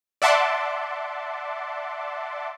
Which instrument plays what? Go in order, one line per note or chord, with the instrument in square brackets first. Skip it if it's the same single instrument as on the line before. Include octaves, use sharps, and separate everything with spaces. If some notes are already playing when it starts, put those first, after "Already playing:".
[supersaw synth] D5 E5 F#5 A5 C6 D6